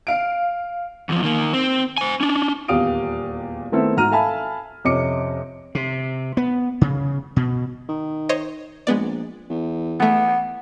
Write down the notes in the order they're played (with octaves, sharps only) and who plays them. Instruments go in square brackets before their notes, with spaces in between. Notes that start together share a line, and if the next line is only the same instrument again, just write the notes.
[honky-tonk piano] F5 D7
[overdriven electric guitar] E2 F3
D#3 A#3
C4
C5 G#5
C#4 D4
[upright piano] D#1 E2 G4 F5 D#6 D7
D#3 A3 B3 C4 E4 A4
G#2 F#4 A#5 F6 D#7
A4 E5 F5 G#5 A5 B5
F2 C3 C#4 D#5 D6 C#7
[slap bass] C3
B3
C#3
B2
[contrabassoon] D#3
[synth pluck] C5 C#5 D#5
[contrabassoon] A#1 [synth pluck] G#3 B3 D5
[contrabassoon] E2
[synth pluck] E3 A3 [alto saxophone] B3